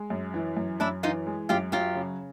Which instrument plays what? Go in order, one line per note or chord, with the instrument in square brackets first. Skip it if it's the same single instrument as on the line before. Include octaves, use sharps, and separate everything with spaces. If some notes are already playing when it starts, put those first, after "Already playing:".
Already playing: [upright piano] G#3
F#2
E3
F#2
[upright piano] F#2 [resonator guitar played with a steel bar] D4 E4
[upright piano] E3 [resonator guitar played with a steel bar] D#4 F4
[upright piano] G#3
[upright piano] F#2 [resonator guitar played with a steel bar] F4 G4
[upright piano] F#3 [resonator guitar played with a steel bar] F4 G4
[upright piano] C#3